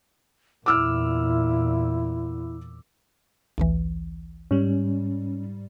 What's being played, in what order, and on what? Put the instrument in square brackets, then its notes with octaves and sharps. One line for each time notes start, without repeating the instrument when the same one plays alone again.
[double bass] E2 A#2 [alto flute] E4 [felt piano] D6 E6 F6
[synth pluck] A1 D2 E3
[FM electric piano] G#2 G3 [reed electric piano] C#4